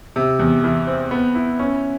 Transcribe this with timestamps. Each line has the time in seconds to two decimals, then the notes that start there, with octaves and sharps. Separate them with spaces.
0.16 C3
0.39 E2
0.64 E3
0.87 C4
1.11 B3
1.35 E4
1.59 C#4